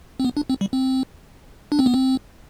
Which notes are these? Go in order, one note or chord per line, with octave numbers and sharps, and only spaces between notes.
C4
B3
D4
C4
G3
C4
D4
C4
B3
C4